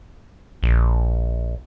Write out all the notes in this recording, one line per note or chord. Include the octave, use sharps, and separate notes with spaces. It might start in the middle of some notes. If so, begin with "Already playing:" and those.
A#1